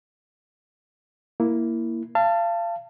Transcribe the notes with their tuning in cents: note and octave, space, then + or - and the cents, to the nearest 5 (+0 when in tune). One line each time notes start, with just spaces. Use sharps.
A#3 +0 E4 +0
F5 -30 A5 +15